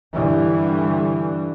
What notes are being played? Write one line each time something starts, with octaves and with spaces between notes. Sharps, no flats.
G2 D3 E3 G3